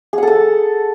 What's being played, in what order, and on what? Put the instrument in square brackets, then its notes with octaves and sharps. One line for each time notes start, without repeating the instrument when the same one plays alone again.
[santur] G#4
F#5
A4
A5